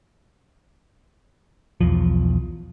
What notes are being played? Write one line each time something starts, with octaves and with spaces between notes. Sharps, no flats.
B1 E2 F3